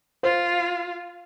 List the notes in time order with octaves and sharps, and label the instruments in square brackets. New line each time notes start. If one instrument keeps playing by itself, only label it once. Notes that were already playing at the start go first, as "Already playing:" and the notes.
[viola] F4 [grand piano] C5